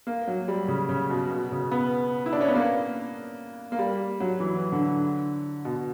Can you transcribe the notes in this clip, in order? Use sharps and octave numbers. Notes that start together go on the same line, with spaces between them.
A#3
F#3
G3
C#3
C#3
B2
B2
C#3
B3
E4
D4
C#4
B3
A#3
A#3
G3
F#3
E3
D3
B2